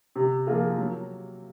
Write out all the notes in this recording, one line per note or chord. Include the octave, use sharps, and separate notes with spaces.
C3
F3 A#3 F4 G#4
F#3